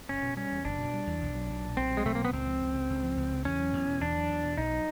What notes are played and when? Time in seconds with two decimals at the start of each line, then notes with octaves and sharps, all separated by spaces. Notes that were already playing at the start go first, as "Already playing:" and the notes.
0.09 F#1 C#4
0.23 B2
0.37 G3 C#4
0.52 E2
0.65 F#1 D4
0.79 B2
0.94 G3
1.07 E2
1.22 B1
1.35 F#3
1.50 B1
1.64 A#2
1.77 B1 C4
1.91 F#3
1.97 G#3
2.05 B1 A3
2.15 A#3
2.20 A#2 B3
2.33 C#2 C4
2.47 F3
2.61 C#2
2.75 C#3
2.90 C#2
3.03 F3
3.17 C#2
3.32 C#3
3.45 E2 C#4
3.59 F#3
3.73 E2
3.87 B2
4.01 E2 D4
4.15 F#3
4.30 E2
4.43 B2
4.57 B1 D#4
4.72 F#3